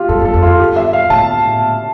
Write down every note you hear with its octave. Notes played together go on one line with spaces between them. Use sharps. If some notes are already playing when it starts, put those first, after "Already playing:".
Already playing: F4 G4
G2 A4
G2 A4
F2
F4
G2
G4
E5
F5
A2 A5